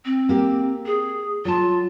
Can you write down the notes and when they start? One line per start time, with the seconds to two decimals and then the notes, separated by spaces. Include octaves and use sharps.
0.05 C4
0.29 A#3 G4
0.86 G#4
1.45 F#3 F4 A5